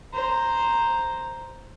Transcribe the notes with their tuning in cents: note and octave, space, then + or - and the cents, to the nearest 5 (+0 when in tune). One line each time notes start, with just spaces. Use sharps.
C5 +0 A#5 +0